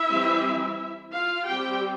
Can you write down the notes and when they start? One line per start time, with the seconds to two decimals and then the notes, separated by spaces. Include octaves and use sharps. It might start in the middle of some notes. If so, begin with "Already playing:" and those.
Already playing: E4 E5
0.09 E3 G3 C4
1.13 F4 F5
1.48 G3 C4 G4 G5